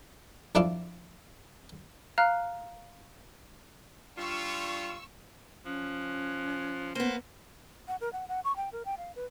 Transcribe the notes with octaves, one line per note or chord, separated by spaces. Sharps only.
F2 D4 E4 F4 C6 D6
F5 A#5 F6 F#6
G3 D4 F4 C#6 E6
F3 C#4 F#6
A#3 B3 C5
F#5
A#4
F#5
F#5
C#6
G5
A#4
G5
F5
B4